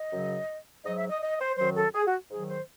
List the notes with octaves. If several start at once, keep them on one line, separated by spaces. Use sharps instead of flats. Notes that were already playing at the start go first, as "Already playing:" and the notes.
Already playing: D#5
F#2 C#3 F#3
G#2 F#3 D#5
E5
D#5
D#5
C5
F#2 D#3 F#3 C5
A4
G#4
F#4
G#2 D#3 F#3 G#4
C5